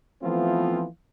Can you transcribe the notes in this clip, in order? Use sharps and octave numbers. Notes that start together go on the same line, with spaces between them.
E3 F3 A3 B3 C4 F4